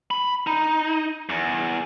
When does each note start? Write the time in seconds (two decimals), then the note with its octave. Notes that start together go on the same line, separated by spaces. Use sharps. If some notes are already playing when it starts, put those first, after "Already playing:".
0.11 B5
0.47 D#4
1.29 E2